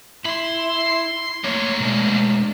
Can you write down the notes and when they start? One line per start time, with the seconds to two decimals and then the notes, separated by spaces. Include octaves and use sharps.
0.25 E4 B5 C6
1.44 A3 A#3 C#5
1.80 B2 G#3 D4